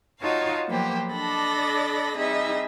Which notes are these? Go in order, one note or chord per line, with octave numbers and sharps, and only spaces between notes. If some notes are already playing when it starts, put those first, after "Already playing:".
D#4 F4 F#4 C#5 F5 A5
F3 F#3 A#3 B3 G4 C5
D4 A4 D5 D#5 B5 A#6
G3 C4 D#4 G#4 D#5 E5